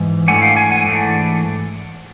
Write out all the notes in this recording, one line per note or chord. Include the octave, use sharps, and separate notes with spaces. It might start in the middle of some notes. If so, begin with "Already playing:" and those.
Already playing: G#2 E3
G#2 E3 A3 D4 F#5 G#5
F5 G5
F#5 G#5
F#5 G#5
G#2 E3 A3 D4